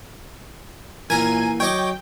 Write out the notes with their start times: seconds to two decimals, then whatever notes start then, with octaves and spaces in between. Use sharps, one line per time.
1.10 A#2 E3 A#3 A#4 G#5 D#7
1.60 F#3 C#5 D#5 G5 D6